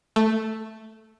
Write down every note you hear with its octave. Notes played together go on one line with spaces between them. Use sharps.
A3